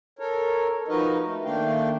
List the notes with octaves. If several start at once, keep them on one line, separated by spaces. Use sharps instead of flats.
A4 A#4 C#5
F3 D#4 F#4 A#4 B4 D#5
A3
D#3 A3 A#3 D4 F5 G5